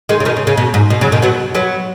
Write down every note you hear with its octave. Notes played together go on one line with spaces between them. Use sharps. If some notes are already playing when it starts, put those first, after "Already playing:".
D#3 G#3
C#3
B2 D#3
C#3
C#3
B2
G#2
B2
C#3 F#3
B2 D#3
F#3 B3
F#3 B3